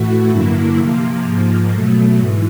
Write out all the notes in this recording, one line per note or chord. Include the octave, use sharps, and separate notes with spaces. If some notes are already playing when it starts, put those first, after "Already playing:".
Already playing: A2 E3 A3 F#4
G2 D3 F#3 A#3 E4
C3 F3 A#3
G#2 F3 A#3
B2 F#3 A3
G#2 E3